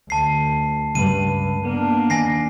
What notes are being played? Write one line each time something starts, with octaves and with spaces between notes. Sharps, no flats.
D2 A5 C7
C#2 G2 B4 D#7
A#3 B3 D4
D#2 G#5 A#6 C7